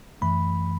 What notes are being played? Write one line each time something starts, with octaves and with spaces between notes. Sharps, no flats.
F#2 E3 A3 B5